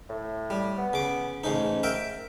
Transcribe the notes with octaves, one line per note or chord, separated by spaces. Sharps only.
A2
G3
B3
C#3 D6
A1 G#2 C#3 D#4
A#4 E5 G5